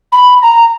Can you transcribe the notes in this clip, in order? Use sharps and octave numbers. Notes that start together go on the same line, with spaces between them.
B5
A#5